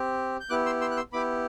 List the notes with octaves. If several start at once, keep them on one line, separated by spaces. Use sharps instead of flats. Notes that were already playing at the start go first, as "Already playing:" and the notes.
Already playing: C4 G4
G6
B3 E4 G4 D6 F#6
C6 E6
C6 E6
F#6
C6 E6
B3 E4 G4 B5 D6